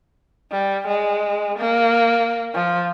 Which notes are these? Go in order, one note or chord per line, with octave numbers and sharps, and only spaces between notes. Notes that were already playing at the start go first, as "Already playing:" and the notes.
G3
G#3
A#3
F3